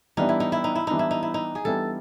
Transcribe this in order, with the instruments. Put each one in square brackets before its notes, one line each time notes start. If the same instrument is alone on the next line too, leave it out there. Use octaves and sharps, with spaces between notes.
[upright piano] E3 G3 B3 D4 [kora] D#4
[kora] E4
D#4
E4
D#4
E4
[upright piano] E3 G3 B3 D4 [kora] D#4
[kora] E4
D#4
E4
D#4
G#4
[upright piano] E3 G3 B3 D4 [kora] A4